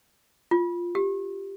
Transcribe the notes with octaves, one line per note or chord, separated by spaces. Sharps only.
F4
G4